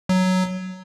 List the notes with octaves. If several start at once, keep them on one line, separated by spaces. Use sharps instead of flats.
F#3